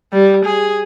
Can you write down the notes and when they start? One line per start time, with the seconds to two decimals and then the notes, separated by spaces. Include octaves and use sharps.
0.13 G3
0.45 G#4